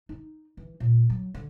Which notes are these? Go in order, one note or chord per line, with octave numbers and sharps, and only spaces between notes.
D#4
E3
A#2
F#3
D3